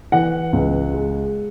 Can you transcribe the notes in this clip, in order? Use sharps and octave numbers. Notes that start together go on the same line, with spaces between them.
E3 F#5
C#2
G#3